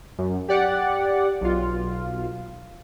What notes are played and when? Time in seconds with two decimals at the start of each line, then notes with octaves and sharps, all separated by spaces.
0.18 F#2
0.48 G4 D5 F#5
1.41 B1 F4